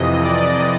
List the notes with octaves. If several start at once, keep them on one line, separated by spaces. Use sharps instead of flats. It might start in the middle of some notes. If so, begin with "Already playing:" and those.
Already playing: F2 C3 E3 D#5
D5